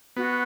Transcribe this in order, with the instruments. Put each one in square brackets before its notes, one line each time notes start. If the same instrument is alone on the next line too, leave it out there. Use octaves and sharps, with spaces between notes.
[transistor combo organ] B3 [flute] F#4